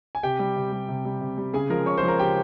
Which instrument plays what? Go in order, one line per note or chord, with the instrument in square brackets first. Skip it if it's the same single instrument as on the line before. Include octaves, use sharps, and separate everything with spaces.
[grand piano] G#5
C3 G4 G5
G3
C3
G3
C3
G3
C3
G3
C#3 G#4 G#5
F3 G#3 A#4 A#5
C#3 C#5 C#6
C5 C6
F3 G#3
A#4 A#5
C#3 G4 G5